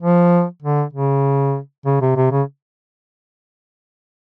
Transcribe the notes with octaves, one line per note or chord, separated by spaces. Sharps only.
F3
D3
C#3
C#3
C3
C3
C#3